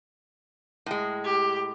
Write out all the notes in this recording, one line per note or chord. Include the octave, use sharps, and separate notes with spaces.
A2 G#3
G4